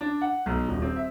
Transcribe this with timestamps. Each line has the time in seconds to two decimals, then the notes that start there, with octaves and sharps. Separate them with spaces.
0.01 D4
0.22 F#5
0.46 B1
0.68 D#1
0.82 C4
0.96 E5